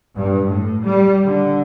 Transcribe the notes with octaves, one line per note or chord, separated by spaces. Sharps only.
G2
A2
G3
D3